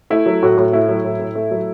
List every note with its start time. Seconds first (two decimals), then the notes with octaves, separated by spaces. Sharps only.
0.10 A3 E4
0.26 F#3
0.43 A2 F#4
0.57 A2
0.73 A3 E4
0.89 F#3
1.05 A2
1.20 A2
1.35 A3
1.51 F#3